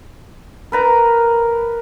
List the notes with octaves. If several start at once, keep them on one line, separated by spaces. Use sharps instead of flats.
A#4 B4 A#5